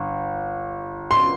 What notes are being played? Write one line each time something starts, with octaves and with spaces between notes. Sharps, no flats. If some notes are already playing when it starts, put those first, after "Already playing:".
Already playing: G1
C6